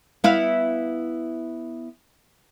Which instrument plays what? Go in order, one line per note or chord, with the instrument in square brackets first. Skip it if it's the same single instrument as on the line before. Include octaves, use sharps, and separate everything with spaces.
[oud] B3 E4 F5